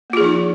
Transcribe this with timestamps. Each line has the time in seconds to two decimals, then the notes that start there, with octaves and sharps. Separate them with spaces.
0.10 A#3
0.13 F4
0.17 G#4
0.21 F3
0.24 D#4